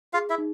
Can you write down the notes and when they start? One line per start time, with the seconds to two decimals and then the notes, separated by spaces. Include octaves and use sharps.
0.14 F4 G#4 F5
0.30 E4 E5
0.38 D#4